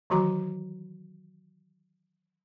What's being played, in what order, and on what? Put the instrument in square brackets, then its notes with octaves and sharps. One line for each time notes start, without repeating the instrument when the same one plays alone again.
[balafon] D#3 E3 F#3 F#4 A#5 D6